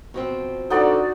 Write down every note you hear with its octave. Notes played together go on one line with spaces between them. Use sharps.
B2 F3 C4
D3 D#4 F#4 D5